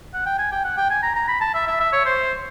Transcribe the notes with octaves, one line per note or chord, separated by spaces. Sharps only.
F#5
G5
G#5
G5
F#5
G5
G#5
A#5
A#5
B5
A5
E5
E5
E5
C#5
C5